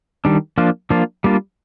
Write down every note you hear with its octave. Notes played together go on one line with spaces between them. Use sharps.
D#3 G3 D4
F3 A#3 D4 F4
F3 A#3 D4 F4
G3 A#3 D4 F4